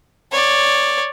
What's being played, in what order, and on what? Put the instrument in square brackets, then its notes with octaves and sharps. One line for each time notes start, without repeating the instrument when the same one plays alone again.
[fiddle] C#5 D5